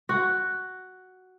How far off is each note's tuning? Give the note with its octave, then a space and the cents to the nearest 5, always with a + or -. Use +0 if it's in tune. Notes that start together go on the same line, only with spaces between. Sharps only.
F#4 +5